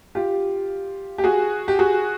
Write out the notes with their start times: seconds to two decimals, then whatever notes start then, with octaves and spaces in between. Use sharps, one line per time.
0.15 F4 G4
1.18 G4
1.24 F#4 G#4
1.68 G4
1.79 F#4 G#4